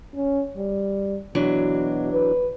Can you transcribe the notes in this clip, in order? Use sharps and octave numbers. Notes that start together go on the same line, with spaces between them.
C#4
G3
B2 E3 F#3 D4
B4